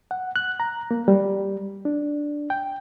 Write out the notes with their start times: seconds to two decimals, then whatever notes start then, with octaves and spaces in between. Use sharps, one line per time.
0.11 F#5
0.36 F#6
0.60 A#5
0.91 A#3
1.08 G3
1.85 D4
2.50 G5